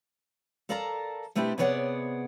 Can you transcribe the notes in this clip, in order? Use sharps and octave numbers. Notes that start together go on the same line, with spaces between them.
A4 A#4 D5 F5 A5 A#5
B2 A3 C4 D4 E4 G4
C3 B3 G#4 C#5 D5 F#5